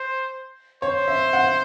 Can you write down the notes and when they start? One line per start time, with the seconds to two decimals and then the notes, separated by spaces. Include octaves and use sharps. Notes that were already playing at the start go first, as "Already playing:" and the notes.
Already playing: C5
0.82 C5 C#5
1.08 E5
1.33 F#5